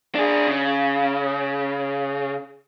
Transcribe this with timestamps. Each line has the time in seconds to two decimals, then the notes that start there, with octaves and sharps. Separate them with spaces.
0.15 D4 G#4
0.47 C#3